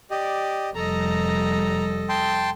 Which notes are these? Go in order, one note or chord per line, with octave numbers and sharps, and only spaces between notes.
G4 D5 D#5
F1 G3 A4 D#5 A#5
G5 A5 C6